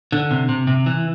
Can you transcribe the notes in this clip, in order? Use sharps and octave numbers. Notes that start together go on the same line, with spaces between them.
D3
C3
C3
C3
E3